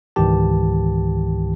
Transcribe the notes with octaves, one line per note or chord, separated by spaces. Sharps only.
C#2 G#2 D#3 E3 G4 A5